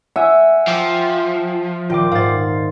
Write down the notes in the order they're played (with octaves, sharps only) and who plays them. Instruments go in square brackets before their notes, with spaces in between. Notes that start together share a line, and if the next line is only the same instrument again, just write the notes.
[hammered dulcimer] E5 [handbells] F#5 G#5
[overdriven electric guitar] F3 [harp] G5 D6
[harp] D#1 [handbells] F4 G5 D6
[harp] G#2 C5 [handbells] F5 A6